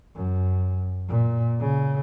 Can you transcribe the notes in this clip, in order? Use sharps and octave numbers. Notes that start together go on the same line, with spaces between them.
F#2
A#2
C#3